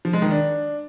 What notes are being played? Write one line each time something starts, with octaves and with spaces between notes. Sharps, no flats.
F3
G#3
D#3
D4